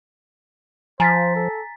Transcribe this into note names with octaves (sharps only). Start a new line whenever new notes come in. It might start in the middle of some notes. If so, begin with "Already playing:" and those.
F3 C5 G#5 A#5 A6 B6
A4